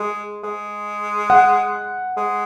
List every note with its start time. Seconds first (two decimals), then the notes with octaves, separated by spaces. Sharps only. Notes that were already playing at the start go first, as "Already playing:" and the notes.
Already playing: G#3
0.44 G#3
1.30 F#5
2.17 G#3